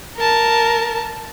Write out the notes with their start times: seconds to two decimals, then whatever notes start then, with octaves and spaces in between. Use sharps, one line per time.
0.17 A#4 A5